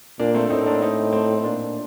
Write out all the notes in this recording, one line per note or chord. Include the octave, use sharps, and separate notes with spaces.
A#2 A#3 D4
A3 C4
A2 C4 D#4
A#3 D4
C4 D#4
A3 C4
A#2 D4 F4